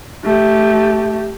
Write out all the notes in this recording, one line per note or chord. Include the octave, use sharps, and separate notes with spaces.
A3 G4